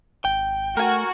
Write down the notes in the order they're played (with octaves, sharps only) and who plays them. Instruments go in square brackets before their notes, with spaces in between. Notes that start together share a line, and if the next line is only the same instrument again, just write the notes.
[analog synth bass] G#1 [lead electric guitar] G5
[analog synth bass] A3 [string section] F#4 [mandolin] A#4 G#5